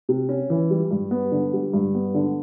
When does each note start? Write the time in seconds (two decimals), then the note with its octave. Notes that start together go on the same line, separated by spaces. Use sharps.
0.09 C3
0.29 C#4
0.50 E3
0.70 G3
0.91 G2
1.11 B3
1.32 D3
1.53 G3
1.73 G2
1.95 B3
2.14 D3